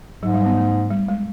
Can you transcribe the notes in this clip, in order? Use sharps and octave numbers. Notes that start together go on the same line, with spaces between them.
G#2 F#3
G3
B3
A3
G3
G#3